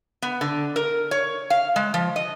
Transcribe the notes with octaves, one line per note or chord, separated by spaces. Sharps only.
B3
D3
A#4
C#5
F5
G#3
F3
D#5